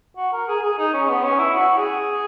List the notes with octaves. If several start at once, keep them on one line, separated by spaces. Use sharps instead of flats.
F#4
A#4
G#4
G#4
D#4
C#4
B3
C#4
E4
F#4
G#4